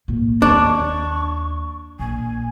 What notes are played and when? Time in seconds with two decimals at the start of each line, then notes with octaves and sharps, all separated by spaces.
0.08 A2 A#3
0.42 D#2 D4 C#6
1.99 A#1 G#5